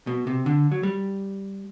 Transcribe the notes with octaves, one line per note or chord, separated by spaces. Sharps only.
B2
C3
D3
F#3
G3